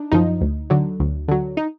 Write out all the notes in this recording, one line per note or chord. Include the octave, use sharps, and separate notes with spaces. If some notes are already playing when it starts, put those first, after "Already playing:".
Already playing: D4 D#4
F#2 F3 D#4
D2
D3 F#3
D2
D3 F#3
D#4